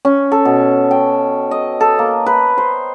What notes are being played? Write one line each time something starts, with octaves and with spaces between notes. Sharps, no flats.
C#4
A4
B2
G5
D#5
A4
A#3
B4
C5